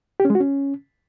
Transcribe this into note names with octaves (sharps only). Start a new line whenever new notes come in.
G4
C#4
G#3
F#4
C#4